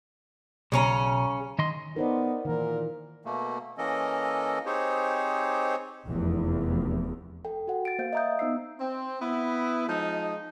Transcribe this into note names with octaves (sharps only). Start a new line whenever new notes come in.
B1 C#3 C#4 A#5
D#3 D#5 C6
B3 D#4 A#4 C5 D5
A#2 D#3 E3 A#4
B2 A3 A#3
E3 A#3 C#4 A4 A#4 D#5
C4 D#4 G4 G#4 C5 C#5
F1 E2
A4 G5
F#4 F#5
A6 D7
A#3 C5 F5 G6
D#5 E5 A#5 D#6 G6
B3 D#4 C5 E6 C7
C4
B3 E4
F3 G#3 D#4